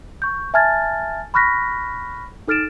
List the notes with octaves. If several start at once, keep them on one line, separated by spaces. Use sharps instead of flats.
C#6 G6
E5 G#5 A5 F6 G#6 A6
B5 C#6 F6 F#6 A#6 B6
D#4 A4 F6 A6 D7 E7